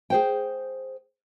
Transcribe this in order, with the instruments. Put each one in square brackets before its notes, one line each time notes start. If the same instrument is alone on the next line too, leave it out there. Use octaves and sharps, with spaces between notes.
[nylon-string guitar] G#4 C5 G5